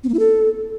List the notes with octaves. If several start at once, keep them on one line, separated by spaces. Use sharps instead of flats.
C4
A#3
E4
A4